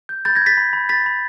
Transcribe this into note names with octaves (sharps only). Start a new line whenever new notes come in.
G6
B5 G6 A6
G#6 A#6
G6 A6 B6
B5
B5
B5 A6 B6
B5